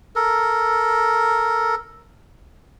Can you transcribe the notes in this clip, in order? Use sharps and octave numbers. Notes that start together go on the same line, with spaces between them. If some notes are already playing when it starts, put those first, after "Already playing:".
A4 A#4